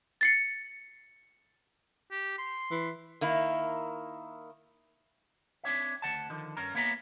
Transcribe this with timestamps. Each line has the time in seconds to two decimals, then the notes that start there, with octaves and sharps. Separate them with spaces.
0.21 A6 C7 C#7
2.11 G4
2.38 C6
2.71 E3
3.21 D#3 A#3 E4
5.64 C4 D4 C#5 E5
6.02 D2 F#3 F#5 A5
6.30 D3 D#3 F3
6.57 G2 C#4 A#4 A#5
6.75 A#3 B3 C#5 E5 G5 A#5